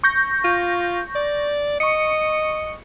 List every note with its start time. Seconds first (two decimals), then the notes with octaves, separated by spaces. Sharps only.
0.04 C#6 G6 A#6
0.44 F4
1.15 D5
1.80 D#5 C#6 C#7